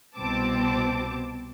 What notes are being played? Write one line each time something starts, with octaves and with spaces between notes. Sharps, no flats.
C2 B2 C4 A5 D6